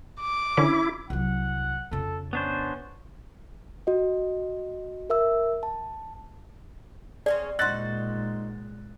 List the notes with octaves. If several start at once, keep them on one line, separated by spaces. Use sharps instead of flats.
D6
D3 D#3 C#4 E4
C2 F#3 F#5
F2 C#3 A4
B3 C#4 D4 C5
F#4 D#5
A#4 E5 E6
A5
C4 C#4 G#4 D5
A#2 G#3 D#4 F#4 C5 F#6 A6